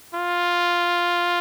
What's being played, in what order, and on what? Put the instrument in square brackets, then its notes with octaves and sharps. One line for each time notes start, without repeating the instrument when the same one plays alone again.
[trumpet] F4